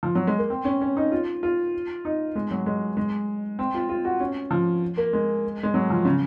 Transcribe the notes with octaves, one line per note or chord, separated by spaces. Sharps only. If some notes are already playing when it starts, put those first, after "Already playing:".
F3
F#3
G#3
A#3
C4
C#4
C#4
D#4
F4
F4
D#4
G#3
F#3
G#3
G#3
C4
F4
F4
F#4
C#4
F3
A#3
G#3
G#3
F#3
F3
C#3